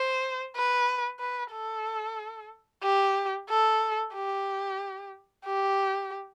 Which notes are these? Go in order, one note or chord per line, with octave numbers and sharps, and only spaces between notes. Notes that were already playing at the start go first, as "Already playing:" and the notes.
Already playing: C5
B4
B4
A4
G4
A4
G4
G4